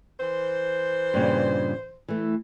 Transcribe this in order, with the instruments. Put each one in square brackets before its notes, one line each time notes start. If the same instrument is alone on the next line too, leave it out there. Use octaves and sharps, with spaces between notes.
[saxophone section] E3 C5
[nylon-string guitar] G2 A#2 C#3
E3 A3